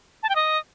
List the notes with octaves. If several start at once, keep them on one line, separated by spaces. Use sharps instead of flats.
A5
G5
D#5